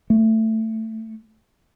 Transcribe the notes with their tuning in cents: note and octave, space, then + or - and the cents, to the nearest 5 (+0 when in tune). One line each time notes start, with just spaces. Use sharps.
A3 +15